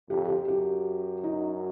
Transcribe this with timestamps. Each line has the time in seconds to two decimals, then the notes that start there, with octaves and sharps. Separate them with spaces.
0.10 F2 G4
0.28 G4
0.48 F#2 G4
1.24 D#4